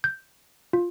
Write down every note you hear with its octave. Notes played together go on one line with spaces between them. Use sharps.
G6
F4